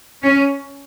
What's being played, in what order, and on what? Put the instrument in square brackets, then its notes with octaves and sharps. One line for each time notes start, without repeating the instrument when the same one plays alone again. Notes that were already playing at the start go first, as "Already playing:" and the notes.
[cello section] C#4